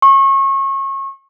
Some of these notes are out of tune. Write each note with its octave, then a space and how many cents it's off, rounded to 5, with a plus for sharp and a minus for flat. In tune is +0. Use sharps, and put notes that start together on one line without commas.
C#6 -30